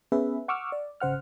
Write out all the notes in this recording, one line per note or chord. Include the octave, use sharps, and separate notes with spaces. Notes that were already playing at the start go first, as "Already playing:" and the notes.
B3 C#4 G#4 B4 E5
F#5 C#6 D6 E6 F6
D5
G#1 C#3 C5 F#5 F6